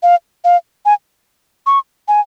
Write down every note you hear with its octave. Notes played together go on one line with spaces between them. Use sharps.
F5
F5
G#5
C#6
G#5